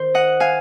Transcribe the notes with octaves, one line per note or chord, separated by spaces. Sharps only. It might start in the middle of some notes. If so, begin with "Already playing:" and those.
Already playing: D#3 C5
D#5 F#5
F5 G#5